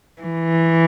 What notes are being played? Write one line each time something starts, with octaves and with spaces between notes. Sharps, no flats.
E3